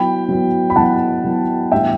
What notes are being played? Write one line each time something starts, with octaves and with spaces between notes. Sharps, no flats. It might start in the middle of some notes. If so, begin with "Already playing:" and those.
Already playing: F#3 B3 E4 G5 B5
F#3 B3 E4
B5
F#3 B3 E4 F#5 A5
F#3 B3 E4
A2 E3 G3 B3 D4 E5 G5